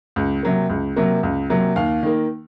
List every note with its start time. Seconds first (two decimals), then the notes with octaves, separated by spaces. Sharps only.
0.16 C#2
0.43 C3 F#3 A#3
0.70 C#2
0.96 C3 F#3 A#3
1.23 C#2
1.50 C3 F#3 A#3
1.76 D#2 F5
2.03 D#3 A#3